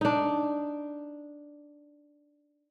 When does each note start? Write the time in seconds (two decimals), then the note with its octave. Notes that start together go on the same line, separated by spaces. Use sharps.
0.01 D4 D#4